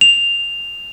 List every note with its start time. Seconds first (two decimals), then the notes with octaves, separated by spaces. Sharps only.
0.01 F7